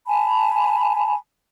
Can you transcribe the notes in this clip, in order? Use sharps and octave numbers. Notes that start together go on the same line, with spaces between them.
G#5 A5 B5